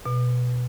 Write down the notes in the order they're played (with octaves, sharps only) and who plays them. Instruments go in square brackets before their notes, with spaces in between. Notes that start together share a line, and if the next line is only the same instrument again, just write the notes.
[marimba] B2